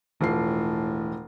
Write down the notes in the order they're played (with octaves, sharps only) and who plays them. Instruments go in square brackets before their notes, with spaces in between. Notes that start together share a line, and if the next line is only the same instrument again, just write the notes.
[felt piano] E1 F3 C7 [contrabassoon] A2